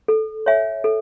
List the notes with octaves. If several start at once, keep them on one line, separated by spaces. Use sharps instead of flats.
A4
C#5 E5 G#5
A4